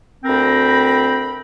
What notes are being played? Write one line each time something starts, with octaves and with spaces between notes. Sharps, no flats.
D2 C4 A#4 G5 A#5 B5